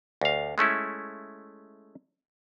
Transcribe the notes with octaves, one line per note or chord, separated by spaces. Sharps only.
D2 F5
G#3 A3 C#4 E4